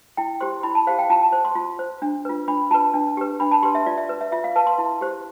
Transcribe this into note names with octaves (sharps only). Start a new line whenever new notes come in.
E4 G5
G4 C5 C6
E4 B5
A5
G4 C5 F5
G5
F4 A5
A5
C5
C6
F4
C5
D4
F4 B4
D4 B5
F4 B4 A5
D4
G4 B4
D4 B5
A5
G4 B4 C6
E5
F4 D5
E5
B4
E5
F4 E5
F5
B4 A5
C6
E4
G4 C5